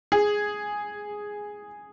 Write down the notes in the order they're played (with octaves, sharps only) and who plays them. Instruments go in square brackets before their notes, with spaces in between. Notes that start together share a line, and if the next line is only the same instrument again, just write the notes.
[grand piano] G#4